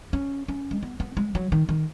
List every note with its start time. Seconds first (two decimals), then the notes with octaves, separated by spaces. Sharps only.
0.13 C#4
0.48 C#4
0.71 G#3
0.83 B3
1.00 B3
1.17 G#3
1.35 F#3
1.52 D#3
1.69 D#3